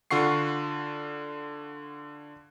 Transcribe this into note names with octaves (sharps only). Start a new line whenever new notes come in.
D3 F4 F#5 C#6 C7